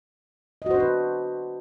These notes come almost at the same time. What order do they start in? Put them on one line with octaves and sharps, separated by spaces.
D#5 F#4 C5 D4 B4